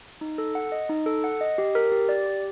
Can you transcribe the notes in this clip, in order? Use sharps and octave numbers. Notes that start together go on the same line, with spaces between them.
D#4
A4
F#5
D#5
D#4
A4
F#5
D#5
G4
A#4
G4
D5
G4